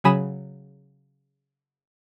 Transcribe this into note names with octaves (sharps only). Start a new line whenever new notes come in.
C#3 F#3 G#5 B5 D#6 E7